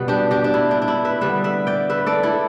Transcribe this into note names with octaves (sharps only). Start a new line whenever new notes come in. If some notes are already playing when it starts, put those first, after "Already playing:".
Already playing: B2 G3 B3 B4
D4 G4
D4 G4
D4
E4
D4
D4
E4
B4 E5
D3 G3 B3 B4 E5
B4 E5
D5 G5
B4 E5
A4 D5
E4 A4